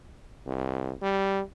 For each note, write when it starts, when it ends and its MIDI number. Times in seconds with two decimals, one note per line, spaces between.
0.46 0.92 36
1.03 1.41 55